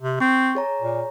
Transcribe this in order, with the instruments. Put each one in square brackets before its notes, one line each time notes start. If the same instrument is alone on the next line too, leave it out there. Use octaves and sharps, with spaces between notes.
[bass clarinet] C3
[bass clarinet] C4 [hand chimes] C#6
[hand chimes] G#4 C#5 A#5
[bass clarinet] A#2